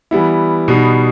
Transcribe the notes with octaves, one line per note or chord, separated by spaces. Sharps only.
E3 G3 B3 E4
B2 G3 B3 D#4